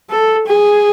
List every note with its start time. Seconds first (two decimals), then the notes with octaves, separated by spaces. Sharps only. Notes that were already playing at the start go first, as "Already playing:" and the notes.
0.10 A4
0.46 G#4